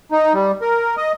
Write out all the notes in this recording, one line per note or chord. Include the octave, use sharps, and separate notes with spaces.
D#4
G3
A#4
D#5